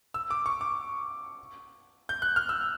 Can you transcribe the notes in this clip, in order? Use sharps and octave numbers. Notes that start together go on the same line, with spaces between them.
E6
D6
C#6
D6
G6
F#6
F6
E6